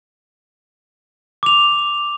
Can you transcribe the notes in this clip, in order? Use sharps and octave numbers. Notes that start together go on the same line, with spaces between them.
D6 F7